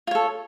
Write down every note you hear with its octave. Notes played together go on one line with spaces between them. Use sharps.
F4 A4 C#5